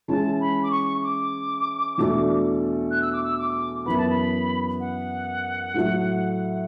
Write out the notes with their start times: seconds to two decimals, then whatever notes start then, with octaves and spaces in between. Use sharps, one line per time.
0.08 E3 G#3 C#4 E4 G#4 A5
0.41 B5
0.63 D6
0.71 C#6
1.03 D6
1.98 E2 B2 A3 D4
2.91 F#6
3.02 E6
3.13 D6
3.24 E6
3.39 D6
3.86 F#2 E3 B3 B5
3.97 A5
4.10 B5
4.80 F#5
5.74 A2 F#3 A3